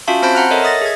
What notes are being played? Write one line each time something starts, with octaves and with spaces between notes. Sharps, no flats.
C#4 F4 F#4 E5 F5 A5
C4 C5 A5 B5 G6 D7
F#5 A#5 C6 F6 F#6
A4 A#4 C#5 D#5 E5
D#5 E5 D#6 A6 A#6
G#4 G#6